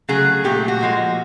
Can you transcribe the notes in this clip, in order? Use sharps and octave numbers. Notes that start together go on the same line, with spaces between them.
C#3 F#3 A3 G#4
A#2 F#3 A3 G4
F#4
A#2 F3 G#3